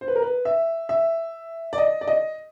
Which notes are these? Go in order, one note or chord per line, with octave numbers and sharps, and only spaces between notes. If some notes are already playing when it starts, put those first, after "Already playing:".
C5
B4
A#4
B4
E5
E5
D5
D#5
D5
D#5